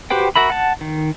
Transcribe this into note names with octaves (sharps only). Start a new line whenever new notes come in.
F#4 G4 B4 C5 G5
F#4 A#4 E5 B5
F#5 A5
D#3